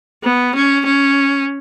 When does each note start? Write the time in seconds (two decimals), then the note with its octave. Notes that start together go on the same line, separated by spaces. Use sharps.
0.24 B3
0.55 C#4
0.86 C#4